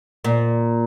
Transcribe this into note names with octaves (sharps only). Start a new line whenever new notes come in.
A#2